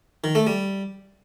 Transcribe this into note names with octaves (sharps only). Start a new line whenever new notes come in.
D#3
A3
G3